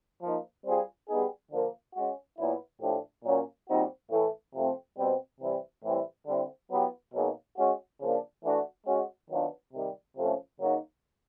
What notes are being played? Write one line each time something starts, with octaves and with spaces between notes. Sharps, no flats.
F3 A#3 D#4
G3 C4 F4 G#4
G3 B3 D#4 G#4
D3 F3 A#3
G#3 C#4 F#4
A#2 F#3 B3 E4
A2 F3 A3 D4 G4
A#2 F#3 A#3 C#4
A#2 G3 C4 D#4 F#4
A2 E3 A3
C3 F3 A3 C4
B2 G3 C4
C3 E3 G3 C4 E4
A2 E3 G3 C4 E4
D3 G3 C4 E4
F#3 B3 E4 G4
B2 F#3 A#3 D#4 G#4
G#3 C#4 F#4
C#3 F3 A#3 D4
E3 A3 D4 F#4
G#3 C#4 F#4
D#3 F#3 B3 D4 F4
C3 D#3 G3
C3 F3 A3 C#4
C#3 F#3 A#3 D#4 F#4